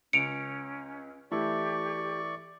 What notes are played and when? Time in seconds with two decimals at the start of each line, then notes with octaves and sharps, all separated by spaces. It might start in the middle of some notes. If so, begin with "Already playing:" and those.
0.13 C#2 C#4 C#7 D7 F7
1.31 E3 A3 E4 G4 D5 C#6